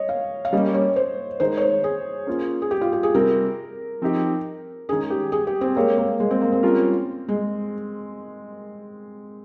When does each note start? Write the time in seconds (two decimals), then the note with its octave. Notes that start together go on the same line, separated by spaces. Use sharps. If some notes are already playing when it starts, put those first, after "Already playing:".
Already playing: C#5 D#5
0.09 F5
0.45 F5
0.53 G3 A#3 C#4 D#5
0.74 C#5
0.96 C5
1.40 D#3 G#3 D#4 A#4 C5
1.57 C#5
1.62 C5
1.84 G#4
2.27 A#3 C#4 F4 C5
2.62 G#4
2.71 G4
2.81 F4
2.93 G4
3.03 G#4
3.14 C3 G3 C4 A#4
4.02 F3 C4 D#4 G4
4.89 D#3 G#3 C#4 G#4
5.10 G4
5.32 G#4
5.47 G4
5.61 C4
5.76 G#3 A#3 C4 G4 C#5
5.98 A#3
6.20 G#3
6.31 C4
6.41 A#3
6.52 C4
6.63 G3 C#4 F4 A#4
7.28 G#3